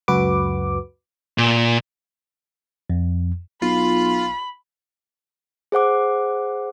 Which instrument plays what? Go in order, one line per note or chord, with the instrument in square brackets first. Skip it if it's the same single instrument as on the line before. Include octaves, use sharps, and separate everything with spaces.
[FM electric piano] C#2 F#2 F#4 B4 D6
[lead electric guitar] A#2
[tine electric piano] F2
[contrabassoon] B1 [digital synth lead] F4 [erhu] B5
[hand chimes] G#4 C5 F#5 D6